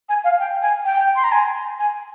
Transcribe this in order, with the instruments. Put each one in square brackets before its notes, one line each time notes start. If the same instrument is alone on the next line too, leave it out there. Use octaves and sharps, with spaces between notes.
[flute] G#5
F5
G5
G#5
G5
C6
A#5
G#5
G#5